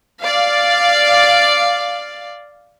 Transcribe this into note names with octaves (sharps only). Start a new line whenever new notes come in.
D5 F5